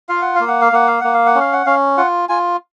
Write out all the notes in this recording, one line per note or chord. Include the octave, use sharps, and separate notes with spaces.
F4 F5
F#5
A#3 F5
F#5
F5
A#3 F#5
F5
A#3 F#5
F5
F#5
C#4
F5
F#5
C#4 F5
F4 F#5
F4 G#5